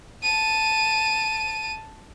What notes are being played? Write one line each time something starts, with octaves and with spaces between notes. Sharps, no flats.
A5 D#7